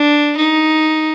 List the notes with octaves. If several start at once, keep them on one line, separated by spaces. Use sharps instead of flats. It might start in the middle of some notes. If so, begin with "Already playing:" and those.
Already playing: D4
D#4